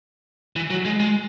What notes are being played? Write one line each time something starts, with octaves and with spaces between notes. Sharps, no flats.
E3
F#3
G#3
G#3